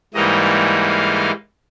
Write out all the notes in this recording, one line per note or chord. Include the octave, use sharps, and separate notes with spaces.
G#2 E3 G3 A#3 D#4 D#5
F5